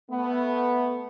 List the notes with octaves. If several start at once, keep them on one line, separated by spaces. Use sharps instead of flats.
A3 B3